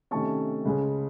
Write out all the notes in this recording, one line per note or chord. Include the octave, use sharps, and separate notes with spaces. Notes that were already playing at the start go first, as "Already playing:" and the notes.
C3 D#3 A3 C#4 A5 C#6
C#2 C#3 G#3 C#4